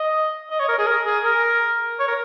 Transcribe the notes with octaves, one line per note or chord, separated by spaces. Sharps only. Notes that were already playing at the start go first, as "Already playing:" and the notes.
Already playing: D#5
D#5
C#5
A#4
G#4
A#4
G#4
A#4
C#5
A#4